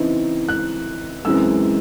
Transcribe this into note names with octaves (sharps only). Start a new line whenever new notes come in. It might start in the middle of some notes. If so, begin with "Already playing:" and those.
Already playing: C#3 E3 C4 D#4
F#6
F#2 E3 G#3 C4 E6